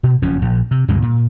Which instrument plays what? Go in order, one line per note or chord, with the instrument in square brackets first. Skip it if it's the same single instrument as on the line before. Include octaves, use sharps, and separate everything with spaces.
[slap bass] B2
F#1 F2 F3 C#4
A#1
C3
D2 G2 C3 G#3
A#2